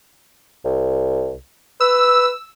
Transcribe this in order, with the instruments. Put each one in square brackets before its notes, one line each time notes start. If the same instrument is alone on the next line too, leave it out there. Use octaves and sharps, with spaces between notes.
[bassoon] C2
[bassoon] B4 [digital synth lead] E6